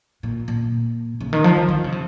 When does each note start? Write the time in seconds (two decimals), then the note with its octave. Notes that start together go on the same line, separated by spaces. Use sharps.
0.23 A#2
0.48 A#2
1.21 C#3
1.33 D#3
1.44 F3
1.57 F3
1.69 D#3
1.84 C#3
1.92 C3